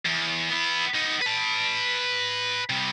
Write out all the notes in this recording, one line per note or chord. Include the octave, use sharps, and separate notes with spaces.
E2
B3 E4
B3 D#4
B4 A5
C3 G3